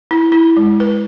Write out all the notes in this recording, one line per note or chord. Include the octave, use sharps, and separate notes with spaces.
E4
E4
G#3
B4